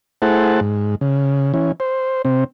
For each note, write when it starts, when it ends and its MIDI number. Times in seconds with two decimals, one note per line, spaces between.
0.22 0.60 57
0.22 0.60 64
0.22 0.60 68
0.22 0.60 72
0.22 0.60 78
0.22 0.60 81
0.60 0.95 44
1.01 1.52 49
1.54 1.72 52
1.54 1.72 61
1.80 2.22 72
2.25 2.44 48
2.25 2.44 60